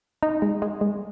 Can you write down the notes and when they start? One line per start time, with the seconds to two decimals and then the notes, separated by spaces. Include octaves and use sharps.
0.23 D#4
0.42 G#3
0.62 G#3
0.81 G#3